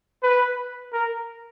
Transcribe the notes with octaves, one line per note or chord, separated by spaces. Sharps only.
B4
A#4